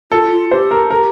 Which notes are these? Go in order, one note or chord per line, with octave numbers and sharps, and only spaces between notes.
F4 A4
F4
G4 C5
A#4
A4 A#4
G4